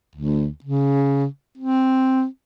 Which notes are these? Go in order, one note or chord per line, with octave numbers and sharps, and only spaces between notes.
D2
C#3
C4